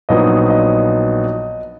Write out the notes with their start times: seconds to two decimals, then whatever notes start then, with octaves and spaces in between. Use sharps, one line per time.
0.09 A#1 A#2 F#3 B3 D#4 D#5
0.50 D#5